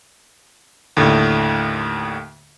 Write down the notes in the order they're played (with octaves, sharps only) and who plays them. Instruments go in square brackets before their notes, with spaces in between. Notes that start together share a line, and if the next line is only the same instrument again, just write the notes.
[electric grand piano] D#2 A2 D3